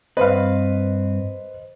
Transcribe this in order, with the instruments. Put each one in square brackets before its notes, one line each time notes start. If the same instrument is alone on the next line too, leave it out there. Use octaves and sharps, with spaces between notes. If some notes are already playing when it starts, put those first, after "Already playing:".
[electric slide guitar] G2 C4 [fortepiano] B4 F5 [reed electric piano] C5 D#5